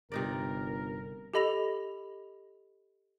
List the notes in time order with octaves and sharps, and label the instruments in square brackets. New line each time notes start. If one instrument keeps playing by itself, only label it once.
[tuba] G1 [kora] C3 D#4 D5 [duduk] A#4
[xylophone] G4 A4 D#5 B5 A#6 F7